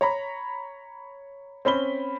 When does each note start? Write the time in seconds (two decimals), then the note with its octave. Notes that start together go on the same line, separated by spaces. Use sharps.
0.01 C#5 A#5 B5
1.65 C4 C#4 B5 G7